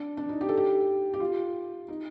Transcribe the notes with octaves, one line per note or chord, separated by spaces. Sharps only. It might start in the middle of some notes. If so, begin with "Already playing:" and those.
Already playing: D4
D4
D#4
G4
A4
G4
G4
F4
D#4